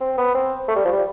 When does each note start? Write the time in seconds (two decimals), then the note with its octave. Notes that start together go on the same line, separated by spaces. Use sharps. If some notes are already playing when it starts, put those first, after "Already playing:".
0.01 C4
0.18 B3
0.34 C4
0.68 A3
0.76 G3
0.85 F3
0.92 G3